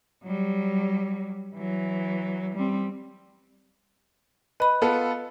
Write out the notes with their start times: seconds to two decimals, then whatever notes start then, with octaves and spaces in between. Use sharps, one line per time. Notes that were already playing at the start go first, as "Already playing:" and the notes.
0.24 F#3 G3
1.55 E3 F#3
2.55 G3 C4
4.60 B4 D#5 B5
4.82 B3 F4 A4 B4